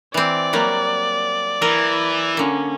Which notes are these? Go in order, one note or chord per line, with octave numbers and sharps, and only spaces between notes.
E3 C4 D5
F#3 G3 A#3
E3 A#4
D3 A#3 C#4